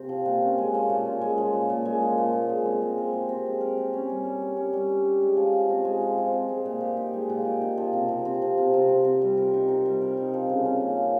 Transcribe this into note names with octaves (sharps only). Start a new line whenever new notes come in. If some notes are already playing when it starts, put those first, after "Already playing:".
Already playing: C3 C4
F3
A#2
C#4
G#3
F3
A#2
C#4
G#3
F3
A#2
A#2
G#3
F3
A#2
A#2
G#3
C4
G#3
A#4
G4
C4
G#3
A#4
G4
C#4
G3
G3
G4
C#4
G3
G3
G4
G#3
F3
F3
C4
G#3
F3
F3
C4
G#3
A#2
G4
D#4
G#3
A#2
G4
D#4
F3
C3
C3
C4
F3
C3
C3
C4
C4
G3
A#4
D#4
C4
G3
A#4
D#4
F3
C#3
C#4
A#3
F3